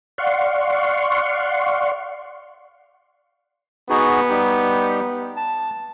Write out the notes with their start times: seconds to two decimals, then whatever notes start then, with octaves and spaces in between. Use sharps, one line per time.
0.18 D5 F5 F#5 C6 C#6
3.90 B3 D#4 F#4 G#4
4.29 G3 D#4 G4
5.37 A5